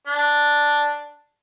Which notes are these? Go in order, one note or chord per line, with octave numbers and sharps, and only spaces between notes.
D4